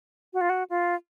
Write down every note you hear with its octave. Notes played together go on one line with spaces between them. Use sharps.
F#4
F4
F#4
F4